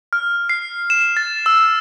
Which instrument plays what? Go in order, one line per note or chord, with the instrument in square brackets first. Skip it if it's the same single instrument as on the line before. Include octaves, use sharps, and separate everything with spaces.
[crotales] F6
C7
E7
A6
E6